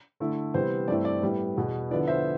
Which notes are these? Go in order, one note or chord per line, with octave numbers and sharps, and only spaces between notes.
D3 A3 E4
C3 E3 G3 B3 C5
G2 E3 A3 C4 E4 D5
D5
A2 G3 B3 E4
E2 B2 B3
D3 F3 B3 E4 D5
C5 E5